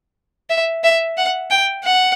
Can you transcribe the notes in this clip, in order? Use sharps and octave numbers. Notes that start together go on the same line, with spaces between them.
E5
E5
F#5
G5
F#5